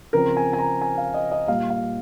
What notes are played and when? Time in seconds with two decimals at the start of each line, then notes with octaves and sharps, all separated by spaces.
0.13 C#3 F3 C4 A#4
0.37 G#5
0.53 G#5
0.59 A#5
0.82 G#5
0.98 F5
1.14 D#5
1.32 D#5
1.48 A#2 G3 A#3 F5
1.70 F5